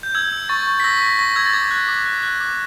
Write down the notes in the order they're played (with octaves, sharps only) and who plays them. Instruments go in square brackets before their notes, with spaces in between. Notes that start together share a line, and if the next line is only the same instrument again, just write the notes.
[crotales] G6
E6 G#6
E6
C#6 A6
C#6
B6
E6 A#6
C#6 B6
C#6 A#6
E6 G#6
A6
D6 G#6
F#6
D6
F#6
F#6
D6